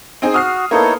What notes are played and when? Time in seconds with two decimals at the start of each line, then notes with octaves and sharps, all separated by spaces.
0.22 C4 D#4 G#4
0.34 F#4 D#6 F6 C7
0.71 A#3 B3 D#4 E4 A4 C#5